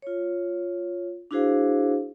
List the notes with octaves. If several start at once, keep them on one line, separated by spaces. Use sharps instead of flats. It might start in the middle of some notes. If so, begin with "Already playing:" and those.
F4 C#5
D4 E4 F#4 G#4 C5 F5